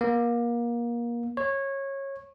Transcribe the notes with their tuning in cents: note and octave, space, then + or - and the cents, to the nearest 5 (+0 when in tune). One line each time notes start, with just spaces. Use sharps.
A#3 +25
C#5 -20